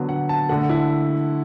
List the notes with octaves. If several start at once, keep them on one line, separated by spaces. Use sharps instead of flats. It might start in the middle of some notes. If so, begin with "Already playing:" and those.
Already playing: D3 F#3 B3
F#5
A5
D3 A3 F#5
E4